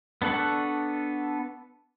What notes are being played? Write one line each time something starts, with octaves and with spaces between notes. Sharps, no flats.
B3 D4 A4 F#5 C#6